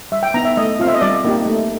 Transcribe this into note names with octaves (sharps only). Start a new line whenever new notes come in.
G3 E5
G5
B3 D#4 A#5
E5
A3 D#5
C4 F4 F5
E5
D#5
G3 D5
A#3 D#4 G4
A3